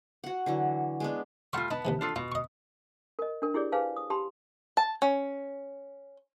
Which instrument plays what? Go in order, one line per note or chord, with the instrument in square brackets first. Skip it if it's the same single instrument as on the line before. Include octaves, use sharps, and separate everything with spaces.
[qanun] F#4 F#5
D3 E3 F#3
G#3 B3 D4
[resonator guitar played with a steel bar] G3 A3 F4 [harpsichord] F#5 C6 C#6
[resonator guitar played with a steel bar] B3 B4 A5 [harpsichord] D#4
[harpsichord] D#2 C3 E3
[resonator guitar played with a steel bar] D4 F4 A4
[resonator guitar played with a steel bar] B2 [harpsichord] F4
[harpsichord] D#5 C#6
[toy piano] A#4 D#5
D4 A#4
E4 G4 G#4 C#5 D5
G#4 B4 C5 F5 G#5 A5
D#6
G4 A5 B5 C6
[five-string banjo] A5
C#4